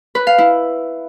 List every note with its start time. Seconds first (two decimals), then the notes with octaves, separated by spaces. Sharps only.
0.15 B4
0.27 F5
0.38 E4